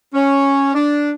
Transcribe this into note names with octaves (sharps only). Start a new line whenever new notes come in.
C#4
D4